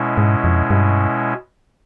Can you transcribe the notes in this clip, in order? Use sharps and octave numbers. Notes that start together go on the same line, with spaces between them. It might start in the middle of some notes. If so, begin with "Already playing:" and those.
Already playing: B2 G#3 C#4 E4
G#2
F2
G2